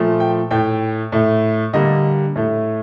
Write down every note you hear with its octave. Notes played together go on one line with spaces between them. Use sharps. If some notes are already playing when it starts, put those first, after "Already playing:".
Already playing: A#2 F3 A3
G5
A2 A3 G5
A2 A3
D3 G3 A#3 D#5
A2 A3